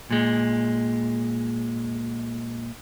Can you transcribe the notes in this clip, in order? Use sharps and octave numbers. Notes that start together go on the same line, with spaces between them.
A#2 G#3